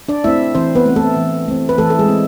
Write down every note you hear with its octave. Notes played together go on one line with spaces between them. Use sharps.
D4 D5
A3 C4 E4 E5
E3 C4 C5
B3 B4
A3
C4
A3 A4
E3
A3 C4
B4
E3 A3 A4
A4
G#3 G#4
C4